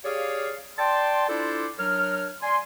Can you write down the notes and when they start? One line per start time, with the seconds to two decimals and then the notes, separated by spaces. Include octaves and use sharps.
0.05 G4 G#4 C#5 D5 F5
0.78 D5 G5 A5 C6
1.29 D4 E4 F4 A4 C5 D5
1.79 F#3 D4 A#4 C#5 F6
2.43 D5 G#5 C6